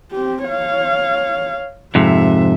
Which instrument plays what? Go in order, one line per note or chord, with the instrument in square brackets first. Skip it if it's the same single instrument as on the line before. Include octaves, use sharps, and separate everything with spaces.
[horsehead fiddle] C4 G4
C#5 F5
[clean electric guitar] F2 G#2 C3 [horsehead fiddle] E5